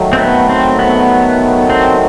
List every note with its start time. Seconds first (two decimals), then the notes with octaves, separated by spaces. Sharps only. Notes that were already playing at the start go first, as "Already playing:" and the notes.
Already playing: D#3 F#3 A3
0.13 C4
0.18 B3
0.49 C4
0.79 B3
1.70 C4